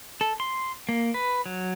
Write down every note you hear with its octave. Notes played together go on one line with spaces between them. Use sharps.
A4
C6
A#3
B4
F#3